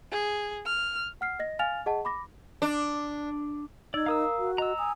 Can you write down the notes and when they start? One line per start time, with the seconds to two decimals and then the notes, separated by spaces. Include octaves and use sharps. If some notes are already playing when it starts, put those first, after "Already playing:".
0.12 G#4
0.66 F6
1.21 F#5 F6 C7
1.39 D#5 A#6
1.59 F5 G#5 F6 A6 F7
1.86 G#4 D#5 F#5 A5
2.05 B5 D6 A#6
2.62 D4
3.94 D#4 D5 E6 G#6
4.06 A#4 F5 A#5 D#6 E6
4.39 F#4
4.58 D#5 A#5 E6
4.78 G#5 D#6